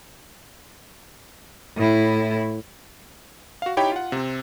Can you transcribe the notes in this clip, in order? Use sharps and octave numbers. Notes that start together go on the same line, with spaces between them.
A2 E4
F#4 F5
D#4 E4 G4 C#5 G5 B5
F4 F#5
C3 C4